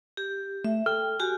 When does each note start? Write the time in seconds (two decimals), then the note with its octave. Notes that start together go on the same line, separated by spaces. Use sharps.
0.17 G4
0.65 A3 E5
0.86 A4 G5 F6
1.20 F#4 G4 G#5